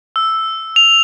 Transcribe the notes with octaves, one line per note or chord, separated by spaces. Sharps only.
E6
F7